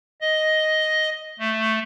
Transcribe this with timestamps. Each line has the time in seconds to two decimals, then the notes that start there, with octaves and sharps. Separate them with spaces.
0.21 D#5
1.39 A3